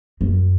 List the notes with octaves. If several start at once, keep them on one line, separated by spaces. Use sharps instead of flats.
F#2